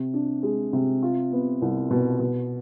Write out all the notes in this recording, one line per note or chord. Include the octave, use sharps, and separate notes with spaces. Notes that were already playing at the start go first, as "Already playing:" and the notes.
Already playing: C3
D4
G#3
C3
F4
B3
C2
B2
B2